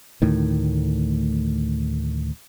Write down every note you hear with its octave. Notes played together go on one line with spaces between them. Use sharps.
D2 A2 D#3